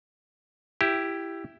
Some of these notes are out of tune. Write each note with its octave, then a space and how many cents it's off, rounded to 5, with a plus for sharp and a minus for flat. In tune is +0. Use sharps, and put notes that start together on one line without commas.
E4 +10 G4 +0